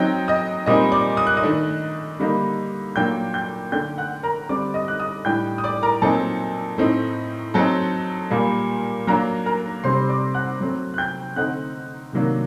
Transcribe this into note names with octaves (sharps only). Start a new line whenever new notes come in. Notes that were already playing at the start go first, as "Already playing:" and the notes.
Already playing: F#3 C4 D#4 G5 G6
D#5 D#6
A#2 G3 C4 D#4 D#5 D#6
D5 D6
D#6
F#6
D#5 D#6
D#3 A3 D4
D3 G3 A#3 D#4
A#2 F#3 A#3 D4 G5 G6
G5 G6
D3 A3 D4 G5 G6
F#5 F#6
A#4 A#5
D3 G3 C4 D5 D6
D#5 D#6
F#6
D#5 D#6
A2 G3 D4 G5 G6
D#6
D5 D6
A#4 A#5
A#2 F#3 C4 D#4 A4 A5
A2 A3 C4 D#4
F#3 C4 D#4 A4 A5
A#2 G3 A#3
F#3 A#3 D4 A#4 A#5
A#4 A#5
C3 G3 C4 C5 C6
D5 D6
F#5 F#6
F#3 A3 C4
F#6
G5 G6
D3 A3 C4 D#4 F#5 F#6
C3 D#3 F#3 A#3 D4